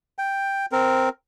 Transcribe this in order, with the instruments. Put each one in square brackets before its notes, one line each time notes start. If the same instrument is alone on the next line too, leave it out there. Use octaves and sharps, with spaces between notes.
[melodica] G5
C4 A#4